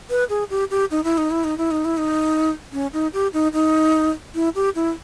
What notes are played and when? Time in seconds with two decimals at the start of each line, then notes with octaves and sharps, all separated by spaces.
0.10 B4
0.30 G#4
0.50 G4
0.71 G4
0.91 D#4
1.04 E4
1.18 D#4
1.31 E4
1.44 D#4
1.58 E4
1.71 D#4
1.85 E4
1.98 D#4
2.73 C#4
2.93 D#4
3.13 G4
3.33 D#4
3.53 D#4
4.35 E4
4.55 G4
4.75 E4